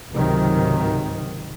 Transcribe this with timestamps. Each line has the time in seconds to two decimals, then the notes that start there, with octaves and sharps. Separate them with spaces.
0.12 C#2 G#2 C3 D#3 F#3